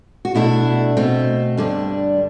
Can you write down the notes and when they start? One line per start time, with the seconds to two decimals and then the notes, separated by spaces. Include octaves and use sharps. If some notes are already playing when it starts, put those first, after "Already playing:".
0.25 F#4
0.35 B2 A3 D4 E4
0.97 B2 A3 C4
1.57 G2 D3 G3 D4